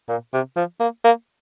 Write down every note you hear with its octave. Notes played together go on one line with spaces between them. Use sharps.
A#2
C3
F3
A#3
A#3